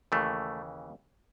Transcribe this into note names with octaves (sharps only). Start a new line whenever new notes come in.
D#2 C#3 E3 A3